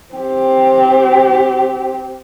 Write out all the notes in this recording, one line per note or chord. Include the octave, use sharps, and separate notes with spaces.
C4 G4